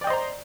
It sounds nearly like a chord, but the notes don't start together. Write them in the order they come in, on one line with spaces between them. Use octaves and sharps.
D5 G5 D#5 C5 A#5